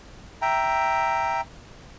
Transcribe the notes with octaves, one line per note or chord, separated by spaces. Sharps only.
E5 G5 A#5